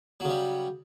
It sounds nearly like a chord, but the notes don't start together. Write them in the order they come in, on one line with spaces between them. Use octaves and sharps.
F#3 C#3 G3